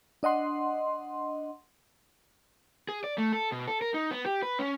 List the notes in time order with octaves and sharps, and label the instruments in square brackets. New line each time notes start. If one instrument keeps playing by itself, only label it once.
[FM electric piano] D4 D#5 F#5 C6
[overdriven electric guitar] G#4
D5
A3
A4
B2
A4
A#4
D#4
B3
G4
B4
C#4